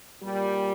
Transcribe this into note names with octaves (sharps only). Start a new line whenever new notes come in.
A#2 G3